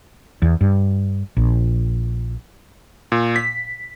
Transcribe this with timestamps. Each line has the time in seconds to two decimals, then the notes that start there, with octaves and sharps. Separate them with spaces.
0.42 E2
0.61 G2
1.37 A#1
3.12 A#2
3.36 B6